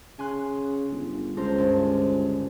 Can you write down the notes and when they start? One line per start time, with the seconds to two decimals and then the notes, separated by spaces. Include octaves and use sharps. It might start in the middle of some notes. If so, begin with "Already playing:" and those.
0.19 C#3 G#5 C6 F#6
0.91 G1
1.37 C#2 A4 A#4 C5
1.58 G1